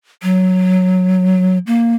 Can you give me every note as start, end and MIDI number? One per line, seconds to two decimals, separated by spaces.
0.23 1.58 54
1.67 1.95 58